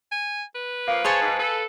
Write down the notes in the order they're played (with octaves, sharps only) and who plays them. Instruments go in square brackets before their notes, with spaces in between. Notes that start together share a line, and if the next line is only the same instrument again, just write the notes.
[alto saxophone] G#5
B4
[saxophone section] F3 A#3 [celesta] F5
[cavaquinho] G#4 G#5 A5 [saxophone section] C5 C#5
[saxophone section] G#2
[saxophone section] A4 [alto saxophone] B4